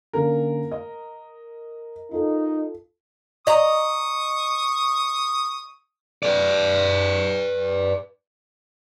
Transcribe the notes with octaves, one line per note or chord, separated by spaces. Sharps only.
D3 A#3 C#4 A#4
D#5
D#4 F4 A4
D#5 A#5 C#6 D#6
B4 D5